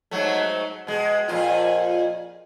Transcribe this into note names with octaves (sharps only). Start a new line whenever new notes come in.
G#2 F#3 A3
B2 G#3
F2 A#2 F4